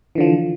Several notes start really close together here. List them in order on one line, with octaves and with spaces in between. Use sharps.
E3 D3 F3